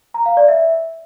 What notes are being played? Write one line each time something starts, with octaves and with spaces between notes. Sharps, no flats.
A#5
F5
D5
E5